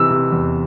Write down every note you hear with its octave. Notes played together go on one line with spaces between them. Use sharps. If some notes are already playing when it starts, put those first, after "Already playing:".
Already playing: C3 E3 E6
C3
E2